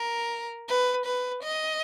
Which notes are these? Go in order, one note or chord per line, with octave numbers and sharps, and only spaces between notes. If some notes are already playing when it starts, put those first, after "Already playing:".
Already playing: A#4
B4
B4
D#5